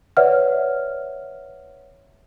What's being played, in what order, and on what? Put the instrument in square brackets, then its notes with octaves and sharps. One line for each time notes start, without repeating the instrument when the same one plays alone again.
[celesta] B4 C#5 D5 E5 F#5 F6